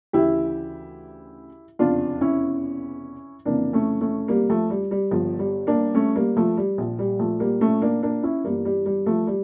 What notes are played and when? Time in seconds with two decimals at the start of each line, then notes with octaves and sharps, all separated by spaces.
0.13 D2 C#3 E3 E4 G4
1.79 F1 E2 C#3 D4 F4
2.21 C#4 E4
3.46 F1 F2 C#3 E3 A#3 D4
3.73 A3 C#4
4.01 A3 C#4
4.28 G3 A#3
4.50 F3 A3
4.70 G3
4.91 G3
5.11 G1 G2 D3 F3
5.39 G3
5.67 A#3 D4
5.95 A3 C#4
6.16 G3 A#3
6.37 F3 A3
6.57 G3
6.78 A#1 A#2 F3
6.99 G3
7.19 F3 A3
7.40 G3 A#3
7.61 A3 C#4
7.82 A#3 D4
8.03 A#3 D4
8.23 C#4 E4
8.44 G1 G2 E3 G3 A#3
8.65 G3
8.86 G3
9.06 F3 A3
9.27 G3